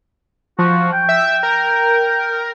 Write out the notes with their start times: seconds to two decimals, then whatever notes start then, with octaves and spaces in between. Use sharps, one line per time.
0.59 F3 F#4
0.92 G5
1.09 E5
1.43 A#4